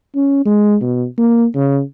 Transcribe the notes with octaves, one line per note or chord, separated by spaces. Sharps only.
C#4
G#3
B2
A#3
C#3